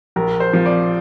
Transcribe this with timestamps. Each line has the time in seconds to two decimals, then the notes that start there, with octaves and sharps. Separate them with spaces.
0.16 A#1 A#4
0.40 C5
0.53 F3
0.66 D5